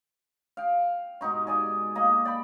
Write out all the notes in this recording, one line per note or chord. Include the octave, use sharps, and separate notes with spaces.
F5 G5
G#2 B2 D#4 C#6
G#4 D5 G#5
A#3 D#5
D5 G5 B5